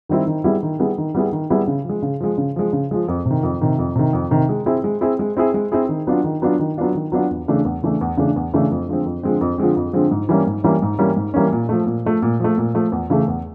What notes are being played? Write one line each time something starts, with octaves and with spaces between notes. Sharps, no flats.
D#3 G3 C4 E4
D#3
G3 B3 E4 G#4
D#3
G3 B3 E4 G#4
D#3
G3 B3 E4 G#4
D#3
G3 B3 E4 G#4
C#3
F3 G#3
C#3
F3 G#3
C#3
F3 G#3
C#3
F3 G#3
F2
C3 D#3
F2
C3 D#3
F2
C3 D#3
F2
C3 D#3
G#3
C4 E4 G#4
G#3
C4 E4 G#4
G#3
C4 E4 G#4
G#3
C4 E4 G#4
D#3
F#3 B3 D4 F4
D#3
F#3 B3 D4 F4
D#3
F#3 B3 D4 F4
D#3
F#3 B3 D4 F4
E2
C#3 E3 A3 D4
E2
C#3 E3 A3 D4
E2
C#3 E3 A3 D4
E2
C#3 E3 A3 D4
F2
D3 F3 G#3 C4
F2
D3 F3 G#3 C4
F2
D3 F3 G#3 C4
F2
D3 F3 G#3 C4
G#2
E3 G3 A#3 C#4
G#2
E3 G3 A#3 C#4
G#2
E3 G3 A#3 C#4
G#2
E3 G3 A#3 C#4
A#2
F3 A3
A#2
F3 A3
A#2
F3 A3
A#2
F3 A3
E2
C#3 E3 A3
E2